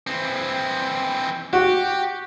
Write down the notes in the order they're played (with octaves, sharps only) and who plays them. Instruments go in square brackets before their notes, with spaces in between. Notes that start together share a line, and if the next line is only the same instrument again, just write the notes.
[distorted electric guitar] E3 C4
[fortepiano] F#4 [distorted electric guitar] G4